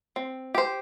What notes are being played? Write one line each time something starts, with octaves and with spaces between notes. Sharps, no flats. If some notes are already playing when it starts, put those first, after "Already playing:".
C4
G4 C5